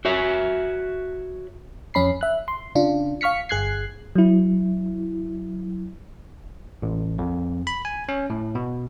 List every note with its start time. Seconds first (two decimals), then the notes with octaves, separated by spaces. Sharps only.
0.05 F#4 C#5 E5
1.94 F2 C#4 B5 C7
2.21 E5 F#6
2.48 C6
2.75 C#3 D4 F4
3.21 F5 C#6 F6 B6 C#7
3.49 G1 G#4 F#6 G#6 C7
4.15 F#3 E4
6.82 A1
7.19 F2
7.67 B5
7.85 G#5
8.09 C#4
8.30 A2
8.55 B2